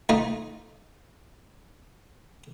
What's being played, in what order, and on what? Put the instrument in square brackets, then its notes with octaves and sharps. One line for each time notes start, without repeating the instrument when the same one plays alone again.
[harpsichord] A3 D#4 F4